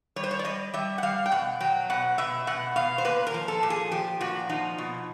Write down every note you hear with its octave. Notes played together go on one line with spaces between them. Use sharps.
G3 C#5
C5
C#5
D5
G3 D#5
G3 E5
F#5
G3 F5
G5
B2 F#5
F#3 G5
B2 F#5
B2 E5
B2 F#5
B2 F5
C5
A#2 B4
A#4
F3
A4
A#2
G#4
F3 G4
A#2 F#4
F3 D#4
B2